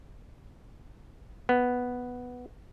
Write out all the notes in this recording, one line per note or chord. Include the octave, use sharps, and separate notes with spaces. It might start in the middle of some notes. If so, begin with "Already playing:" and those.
B3